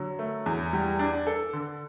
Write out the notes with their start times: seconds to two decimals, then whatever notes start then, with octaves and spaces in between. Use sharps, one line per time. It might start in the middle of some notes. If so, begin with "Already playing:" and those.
Already playing: D3 F#3
0.19 A3
0.46 E2
0.73 G3
0.99 D4
1.27 A4
1.53 D3